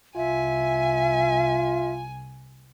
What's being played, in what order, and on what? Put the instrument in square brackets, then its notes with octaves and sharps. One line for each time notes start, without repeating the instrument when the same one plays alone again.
[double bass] C2 [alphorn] F4 [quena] E5 [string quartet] G#5